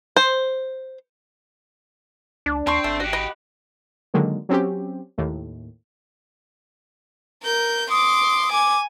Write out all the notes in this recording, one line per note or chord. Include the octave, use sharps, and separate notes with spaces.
C5
C#2 D4
D#2 C4 A5 C6 C#6
G#1 A3
F#4 G4 D#5
D#5 B5
D3 D#3 F#3 G#3 A#3
F#3 C4 C#4 G4
D#2 A2
A#4 G6
C6 D6 D#6
G#5 D6